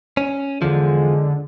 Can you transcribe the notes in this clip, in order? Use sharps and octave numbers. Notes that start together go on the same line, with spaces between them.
C#4
E2 D3 F3 G#3